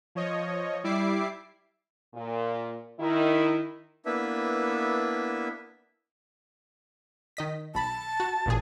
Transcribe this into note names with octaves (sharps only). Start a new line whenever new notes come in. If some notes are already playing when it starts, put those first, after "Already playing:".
F3 C#5 D#5
G3 E4 E5 D6 C7
A#2
D#3 E4
A#3 B3 D4 E4 B4 E5
D#3 D#5 B6
B1 A5 B5
F#4
A1 A#2 G#4